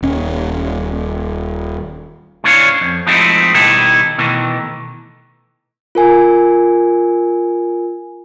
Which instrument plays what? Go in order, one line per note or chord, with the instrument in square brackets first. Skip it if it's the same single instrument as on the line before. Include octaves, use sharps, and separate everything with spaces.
[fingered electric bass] D#1 C#4
[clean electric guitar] D2 A2 C#4 D4 C#5 F5
F2
F3 G#3 A3 C4 D#4 E4
B2 D#3 G3 D#4 E4 A4
B2 D#3 E3 A3
[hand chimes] F4 A#4 G#5